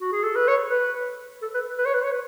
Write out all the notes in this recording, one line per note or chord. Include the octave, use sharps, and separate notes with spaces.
F#4
G#4
A4
B4
C#5
B4
A4
B4
B4
C#5
B4
C#5
B4